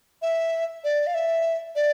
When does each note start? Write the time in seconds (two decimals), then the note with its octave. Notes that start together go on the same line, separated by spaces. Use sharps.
0.22 E5
0.84 D5
1.07 F5
1.14 E5
1.76 D5